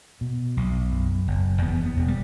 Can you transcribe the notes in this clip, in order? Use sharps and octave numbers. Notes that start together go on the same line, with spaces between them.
B2
B1
F#2
F#1
E2 B3
B3
E1
G3